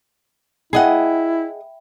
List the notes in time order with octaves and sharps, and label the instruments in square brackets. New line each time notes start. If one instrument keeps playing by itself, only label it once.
[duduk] E4 [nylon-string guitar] G#4 D#5 F#5 [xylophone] E5 G5 B5